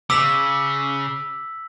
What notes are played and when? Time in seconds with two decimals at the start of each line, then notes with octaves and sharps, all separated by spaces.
0.10 C#3 D6 E6 B6 F#7